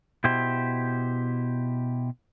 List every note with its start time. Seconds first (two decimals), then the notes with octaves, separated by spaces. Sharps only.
0.24 B2 E4 G4 C5